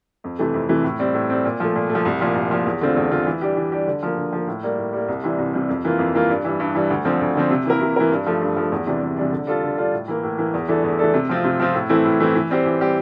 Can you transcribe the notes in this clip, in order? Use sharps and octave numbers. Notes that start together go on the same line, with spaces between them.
F2
C3 E3 A3
F2
C3 E3 A3
A2
G3 C4
A2
G3 C4
A#2
F3 A3
A#2
A3
F3
C2
A#2 F3
C2
A#2 F3
E2
D3 A3 C4 F4
E2
D3 A3 C4 F4
E3
G3 D4 G4
E3
G3 D4 G4
D3
F3 A#3
D3
F3 A#3
A2
G3 A#3
A2
G3 A#3
C2
C3 E3 G3
C2
C3 E3 G3
F2
E3 A#3 F4
F2
E3 A#3 F4
G2
E3 G3
G2
E3 G3
D2
D3 F3 C4
D2
D3 F3 C4
C3
E3 A#3 E4 A#4
C3
E3 A#3 E4 A#4
G2
F3 A3
G2
F3 A3
E2
C3 E3 G3 D4
E2
C3 E3 G3 D4
D3
G3 D4 F4 A4
D3
G3 D4 F4 A4
A2
E3 A#3
A2
E3 A#3
E2
E3 A3 D4 A4
E2
E3 A3 D4 A4
C3
F3 C4 F4
C3
F3 C4 F4
A2
E3 A3 C4 E4
A2
E3 A3 C4 E4
E3
G3 C4 G4 C5
E3
G3 C4 G4 C5